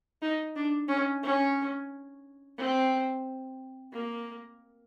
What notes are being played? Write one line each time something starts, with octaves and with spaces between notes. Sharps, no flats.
D#4
D4
C#4
C#4
C4
A#3